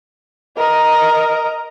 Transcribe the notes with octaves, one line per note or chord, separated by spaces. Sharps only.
A#4 D#5